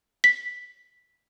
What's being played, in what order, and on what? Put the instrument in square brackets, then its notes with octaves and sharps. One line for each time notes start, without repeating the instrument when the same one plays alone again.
[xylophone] B6